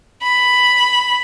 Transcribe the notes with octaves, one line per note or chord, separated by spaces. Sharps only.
B5